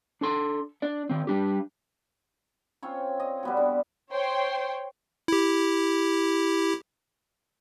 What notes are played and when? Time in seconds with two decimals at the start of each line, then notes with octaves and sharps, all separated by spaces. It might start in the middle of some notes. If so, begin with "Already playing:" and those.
0.21 D4 A4 C6
0.82 D4 D5
1.09 D#3 C4
1.27 G3 D4 G4
2.83 C4 C#4 F4 C#5
3.20 D#5
3.43 G3 B3 F#4
3.57 D3
4.12 C5 C#5 G5 C6
5.28 E4 G4